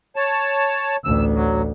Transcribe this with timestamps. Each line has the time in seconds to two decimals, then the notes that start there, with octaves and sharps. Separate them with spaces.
0.16 C#5 A5
1.04 A1 D2 E6
1.34 F#3